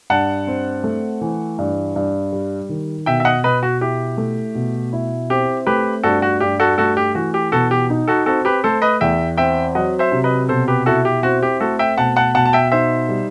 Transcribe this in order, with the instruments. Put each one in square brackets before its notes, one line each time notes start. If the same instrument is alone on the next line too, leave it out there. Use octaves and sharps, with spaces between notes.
[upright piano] G2 [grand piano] F#5 A5
[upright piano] C4
A3
E3
G2
G2
G3
D#3
[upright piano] B2 [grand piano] E5 G5
[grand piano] E5
D#5 F#5
[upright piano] B2 [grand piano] B4 D#5
[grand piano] F#4
[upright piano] E4 [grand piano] G4
[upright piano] A3
B2
E4
[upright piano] C4 [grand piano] G4
[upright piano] A3 [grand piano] G4 B4
[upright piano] G2 [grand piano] F#4 A4
[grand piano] F#4
[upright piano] G2 [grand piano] G4
[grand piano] F#4 A4
[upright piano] A3 [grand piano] F#4 A4
[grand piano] G4
[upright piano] E3 [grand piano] F#4
[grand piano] G4
[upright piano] B2 [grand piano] F#4 A4
[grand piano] G4
[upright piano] D#4
[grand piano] F#4 A4
[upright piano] C4 [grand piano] F#4 A4
[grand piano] G4 B4
[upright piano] A3 [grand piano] A4 C5
[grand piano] B4 D#5
[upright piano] E2 [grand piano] E5 G5
[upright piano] C4 [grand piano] E5 G5
[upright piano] F#3 [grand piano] D#5 F#5
[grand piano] C5 E5
[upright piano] C3
[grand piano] B4 D#5
[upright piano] B2 [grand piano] A4 C5
[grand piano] G4 B4
[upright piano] E4 [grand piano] F#4 A4
[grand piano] G4
[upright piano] C4 [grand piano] F#4
[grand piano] G4
[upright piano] A3 [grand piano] F#4 A4
[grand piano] E5 G5
[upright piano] B2 [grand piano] F#5 A5
[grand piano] F#5 A5
[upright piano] B2 [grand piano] F#5 A5
[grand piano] A5
E5 G5
[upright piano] D#4 [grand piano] C5 E5
[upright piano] G3